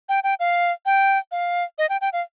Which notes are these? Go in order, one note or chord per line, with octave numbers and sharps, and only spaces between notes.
G5
G5
F5
G5
F5
D#5
G5
G5
F5